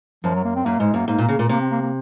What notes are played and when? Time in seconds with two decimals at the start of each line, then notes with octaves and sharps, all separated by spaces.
0.24 F#2 F3
0.34 F#3
0.45 A#3
0.55 C4
0.65 F#2 A#3
0.79 G#2 G#3
0.94 F#2 A#3
1.07 G#2 A#3
1.19 A#2
1.29 C#3
1.39 A#2
1.49 C3 A#3
1.60 C4
1.71 A#3
1.81 A#3